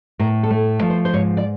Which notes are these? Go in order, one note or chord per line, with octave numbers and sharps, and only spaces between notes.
A2 A#4
A4
A3
F3
C5
C5
G#2 C#5
D5